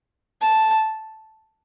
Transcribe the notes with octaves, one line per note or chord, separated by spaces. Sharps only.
A5